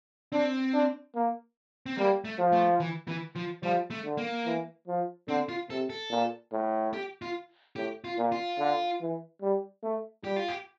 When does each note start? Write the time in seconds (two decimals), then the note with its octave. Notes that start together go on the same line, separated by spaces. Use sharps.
0.32 C4 D4
0.74 D4
1.15 A#3
1.86 C4
1.98 G3 A#3
2.25 A3
2.39 F3
2.53 A3
2.80 E3
3.08 E3
3.36 F3
3.63 F3 G3
3.90 A3
4.04 D3
4.18 A#3
4.46 E3
4.87 F3
5.28 D3 C4
5.49 F4
5.70 C3 A4
5.90 A4
6.10 A#2
6.52 A2
6.93 G4
7.22 F4
7.76 A2 G4
8.04 F4
8.18 A#2
8.32 F4
8.59 D3
9.01 E3
9.42 G3
9.83 A3
10.24 G3 G4
10.36 F4
10.48 G4